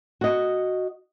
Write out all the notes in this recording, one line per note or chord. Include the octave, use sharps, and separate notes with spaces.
F#4 D#5